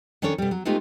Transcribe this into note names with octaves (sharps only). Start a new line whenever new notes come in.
D#3 C#4 D4 A4 C#5
B2 G3
F#3
G#3 A3 B3 D#4 F4 G4